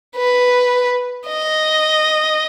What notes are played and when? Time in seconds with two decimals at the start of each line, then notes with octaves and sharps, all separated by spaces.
0.16 B4
1.28 D#5